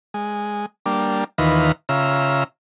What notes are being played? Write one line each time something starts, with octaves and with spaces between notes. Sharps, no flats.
G#3
G3 A#3 D4
D#2 D#3 E3 F4 B4 A#5
C#3 F4 E5 A#5